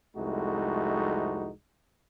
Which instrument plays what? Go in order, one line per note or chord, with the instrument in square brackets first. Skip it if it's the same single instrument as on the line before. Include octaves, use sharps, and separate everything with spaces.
[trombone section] C2 F2 G#3 A3 D#4 F#4